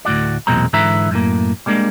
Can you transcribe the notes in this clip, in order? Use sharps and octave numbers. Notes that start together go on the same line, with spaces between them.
D2 A2 F#4 D5
B1 E2 A#2 G#3 C4 A#5
G#2 D3 E3 B4 E5 A#5
F#2 A2 A#3
G3 G#3 A#3 D4